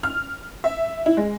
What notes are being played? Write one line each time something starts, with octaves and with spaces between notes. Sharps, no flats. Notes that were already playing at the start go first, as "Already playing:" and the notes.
F6
E5
E4
G#3